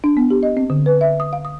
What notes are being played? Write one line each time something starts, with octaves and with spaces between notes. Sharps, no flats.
D4
B3
G4
D#5
C4
D3
B4
E5
D#6
F5
D#6